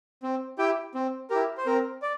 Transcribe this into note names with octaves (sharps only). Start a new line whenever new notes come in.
C4
E4 G4 G5
C4
E4 G4 A#4
C5
C4 A#4
D5